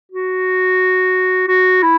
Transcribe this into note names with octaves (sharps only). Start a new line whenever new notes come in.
F#4
F#4
E4